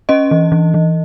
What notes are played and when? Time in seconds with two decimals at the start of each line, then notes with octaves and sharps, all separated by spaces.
0.09 C#4 D#5
0.31 E3
0.52 E3
0.74 E3